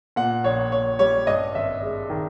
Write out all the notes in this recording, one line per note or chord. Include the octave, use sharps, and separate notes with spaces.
A#2 F#5
A#1 C#5
A#1 C#5
G3 C#5
G2 D#5
G#1 E5
G#3
D#3